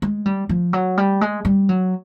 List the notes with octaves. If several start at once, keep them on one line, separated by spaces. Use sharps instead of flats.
G#3
G3
F3
F#3
G3
G#3
G3
F#3